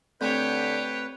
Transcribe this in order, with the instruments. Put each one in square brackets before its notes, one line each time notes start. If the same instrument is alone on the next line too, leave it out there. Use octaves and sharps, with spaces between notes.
[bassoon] D3 [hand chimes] A3 C4 G6 [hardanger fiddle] G4 C#5 [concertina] B4